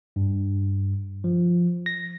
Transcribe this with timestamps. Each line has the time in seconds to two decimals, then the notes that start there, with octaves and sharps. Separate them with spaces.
0.16 G2
1.24 F3
1.86 A#6